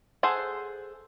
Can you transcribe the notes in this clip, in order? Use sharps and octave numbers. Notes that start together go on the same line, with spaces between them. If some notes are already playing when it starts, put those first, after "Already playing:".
G#4 A4 C5 F#5